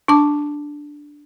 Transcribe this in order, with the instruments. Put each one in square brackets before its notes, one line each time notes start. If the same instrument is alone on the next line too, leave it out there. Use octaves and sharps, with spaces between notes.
[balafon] D4 A5 D6